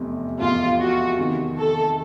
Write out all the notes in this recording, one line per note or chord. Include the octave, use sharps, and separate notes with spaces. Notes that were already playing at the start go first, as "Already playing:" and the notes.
Already playing: F1 E2 C3
F1 E2 C3 F4
F#4
E2 C3 D#3
A4